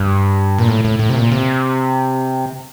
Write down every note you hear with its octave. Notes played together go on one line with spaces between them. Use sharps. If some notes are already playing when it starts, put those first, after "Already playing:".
Already playing: G2
A#2
A2
A2
A2
C3
A#2
C3